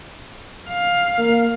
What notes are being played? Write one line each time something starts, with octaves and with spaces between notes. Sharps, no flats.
F5
A#3